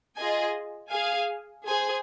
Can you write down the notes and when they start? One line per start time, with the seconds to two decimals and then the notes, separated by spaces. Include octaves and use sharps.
0.16 F4 G#4 D#5 G#5
0.90 G#4 F5 G#5
1.65 G#4 C5 G#5